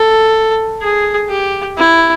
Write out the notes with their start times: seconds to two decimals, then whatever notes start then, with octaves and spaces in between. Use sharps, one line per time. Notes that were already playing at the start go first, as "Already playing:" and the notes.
Already playing: A4
0.82 G#4
1.29 G4
1.78 E4